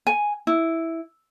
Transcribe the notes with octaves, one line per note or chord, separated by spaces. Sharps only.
G#5
E4